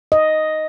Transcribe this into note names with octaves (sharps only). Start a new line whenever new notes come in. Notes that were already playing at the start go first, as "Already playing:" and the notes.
D#5